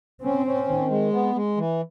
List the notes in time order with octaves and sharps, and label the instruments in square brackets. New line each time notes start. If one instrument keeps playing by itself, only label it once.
[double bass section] C4 [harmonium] C#4
[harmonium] C#4
D#3
G#3
B3
G#3
E3